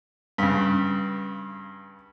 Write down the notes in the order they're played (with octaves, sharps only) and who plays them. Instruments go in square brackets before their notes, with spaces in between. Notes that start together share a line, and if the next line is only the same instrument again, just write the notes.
[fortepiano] G2 C#3